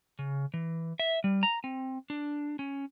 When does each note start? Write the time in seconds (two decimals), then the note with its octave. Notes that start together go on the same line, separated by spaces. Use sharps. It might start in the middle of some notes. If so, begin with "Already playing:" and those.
0.19 C#3
0.54 E3
1.00 E5
1.24 G3
1.43 A#5
1.64 C4
2.10 D4
2.59 C#4